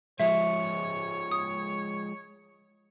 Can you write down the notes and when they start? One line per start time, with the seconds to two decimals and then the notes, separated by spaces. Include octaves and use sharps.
0.19 F3 G#3 C#5 E5
1.31 D#6